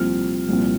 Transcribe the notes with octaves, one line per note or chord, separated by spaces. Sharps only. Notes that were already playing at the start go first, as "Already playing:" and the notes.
Already playing: C2 A#2 F3 C4 F6
C2 A#2 F3 C4